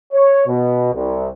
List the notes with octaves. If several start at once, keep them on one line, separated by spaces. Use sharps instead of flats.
C#5
B2
C2